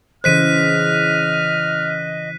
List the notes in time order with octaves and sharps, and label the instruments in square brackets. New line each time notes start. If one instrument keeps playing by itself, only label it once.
[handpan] C#3 E3 C5 [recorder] D#5 [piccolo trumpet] F6 [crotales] F#6 B6 D#7